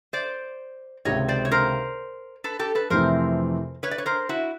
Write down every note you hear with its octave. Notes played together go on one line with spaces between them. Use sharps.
C5 D5
C#2 C3 D#3 C#5 D#5
C5 D5
C#5
A#4 C5
A4 B4
G4 A4
A4 B4
F2 C3 E3 A3 C4 A#4 C5
B4 C#5
D5
C#5
A#4 C5
E4 F#4